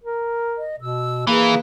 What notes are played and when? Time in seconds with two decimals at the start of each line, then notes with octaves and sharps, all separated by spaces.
0.03 A#4
0.57 D#5
0.80 B2 E6
1.27 E3 A#3 G#4 B4 F5